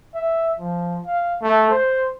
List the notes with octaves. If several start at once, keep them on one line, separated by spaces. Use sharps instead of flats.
E5
F3
F5
A3
C5